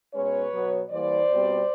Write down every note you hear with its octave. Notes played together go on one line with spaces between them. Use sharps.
B2 G#3 C#4 B4 C#5
B2 F#3 B3
E3 G3 A#3 C5 D5
B2 G3 C4